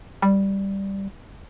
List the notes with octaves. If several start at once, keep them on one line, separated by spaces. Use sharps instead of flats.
G3